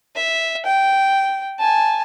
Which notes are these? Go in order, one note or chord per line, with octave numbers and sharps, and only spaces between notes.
E5
G5
G#5 A5